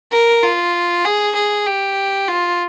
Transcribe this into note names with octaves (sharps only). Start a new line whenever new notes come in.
A#4
F4
G#4
G#4
G4
F4